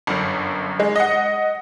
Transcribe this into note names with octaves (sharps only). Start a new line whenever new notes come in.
G1 F#2
G#3
D#5 F#5